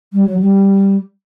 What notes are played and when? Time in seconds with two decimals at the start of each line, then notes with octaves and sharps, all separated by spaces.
0.13 G3
0.26 F#3
0.39 G3